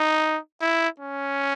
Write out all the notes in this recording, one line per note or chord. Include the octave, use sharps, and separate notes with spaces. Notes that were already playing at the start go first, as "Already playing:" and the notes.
Already playing: D#4
E4
C#4